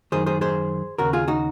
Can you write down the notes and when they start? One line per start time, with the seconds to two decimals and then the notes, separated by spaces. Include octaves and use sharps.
0.12 F#2 D#3 G#4 C5
0.26 G#4 C5
0.41 G#4 C5
0.98 D#2 C#3 F#4 A#4
1.13 F4 G#4
1.28 D#4 F#4